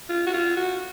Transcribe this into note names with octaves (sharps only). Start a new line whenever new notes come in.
F4
F#4
F4
F#4